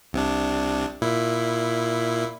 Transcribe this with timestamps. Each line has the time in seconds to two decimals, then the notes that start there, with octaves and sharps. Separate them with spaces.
0.13 C2 C3 D4
1.01 A#2 E4